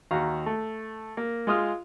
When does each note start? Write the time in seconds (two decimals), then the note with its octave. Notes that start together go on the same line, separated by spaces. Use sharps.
0.11 D#2 F#4 F5 A#5
0.46 A3
1.17 A#3
1.47 G#3 F4 D#6 F6